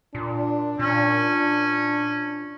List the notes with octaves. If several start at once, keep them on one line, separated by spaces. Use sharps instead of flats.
A#2 D4
A#2 C#4